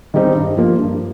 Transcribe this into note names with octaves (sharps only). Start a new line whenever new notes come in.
D#3 G3 C4 D#4
G2
F3 A#3
G2